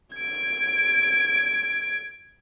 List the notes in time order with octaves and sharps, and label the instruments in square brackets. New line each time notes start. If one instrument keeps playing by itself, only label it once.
[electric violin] G#6 D7